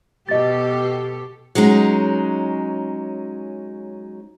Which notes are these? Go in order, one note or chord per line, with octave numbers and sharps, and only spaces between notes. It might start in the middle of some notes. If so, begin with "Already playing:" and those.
B2 G4 A4 D#5 A6
F#3 G#3 C#4 D#4